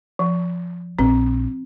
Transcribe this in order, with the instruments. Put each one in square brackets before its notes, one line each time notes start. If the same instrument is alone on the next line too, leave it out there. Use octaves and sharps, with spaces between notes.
[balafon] F3
[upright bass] A#1 [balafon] C4